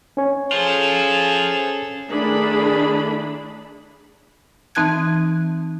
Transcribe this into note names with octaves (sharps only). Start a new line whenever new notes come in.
C#4 C#5
G#4 A4 C5 F5
D#3 A3 D4 E4 G#4 B5
E3 C4 D#4 A5 F#6 G#6